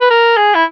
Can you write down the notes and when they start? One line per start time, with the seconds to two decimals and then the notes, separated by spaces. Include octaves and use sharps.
0.01 B4
0.10 A#4
0.37 G#4
0.55 E4